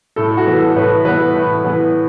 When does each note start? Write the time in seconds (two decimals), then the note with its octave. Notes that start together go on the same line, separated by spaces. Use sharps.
0.16 A2 A4
0.37 F#4
0.46 E3 B3
0.57 A4
0.76 A2 B4
1.05 E3 B3 B4
1.35 A2
1.64 E3 B3